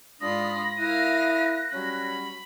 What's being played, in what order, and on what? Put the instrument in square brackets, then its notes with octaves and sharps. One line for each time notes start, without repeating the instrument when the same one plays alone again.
[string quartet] G#2 F4 B5 [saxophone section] D4 [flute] D#6 [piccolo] A#6
[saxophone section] E4 [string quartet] A#4 F5 D#6 [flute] F#6
[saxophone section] F#3 G3 C#4 [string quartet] B5